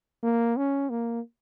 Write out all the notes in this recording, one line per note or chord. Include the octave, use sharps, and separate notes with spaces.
A#3
C#4
A#3